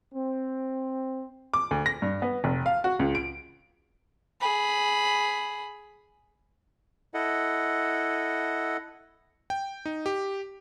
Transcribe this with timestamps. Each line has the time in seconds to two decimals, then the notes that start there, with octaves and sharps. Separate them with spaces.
0.14 C4
1.54 D6
1.71 D2
1.86 A#6
2.02 G2
2.22 B3
2.44 F1
2.66 F5
2.84 F#4
2.99 C#2
3.15 D7
4.41 G#4 B5
7.14 E4 A4 D#5 F#5
9.50 G5
9.85 D#4
10.06 G4